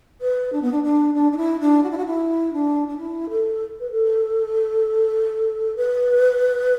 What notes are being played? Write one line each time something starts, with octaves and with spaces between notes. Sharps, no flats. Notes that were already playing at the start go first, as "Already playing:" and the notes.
B4
D4
B3
D4
D4
D4
D4
E4
D4
F#4
E4
F#4
E4
D4
D4
E4
A4
B4
A4
B4